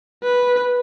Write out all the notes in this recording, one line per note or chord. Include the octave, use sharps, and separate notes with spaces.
B4